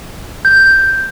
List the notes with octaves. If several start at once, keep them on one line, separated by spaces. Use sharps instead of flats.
G6